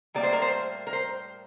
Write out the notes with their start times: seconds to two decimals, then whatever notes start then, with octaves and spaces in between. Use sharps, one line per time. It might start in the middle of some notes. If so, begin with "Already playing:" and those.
0.14 A2 G3 A#3 D5
0.23 C5
0.32 A#4
0.42 C5
0.87 A#4
0.93 C5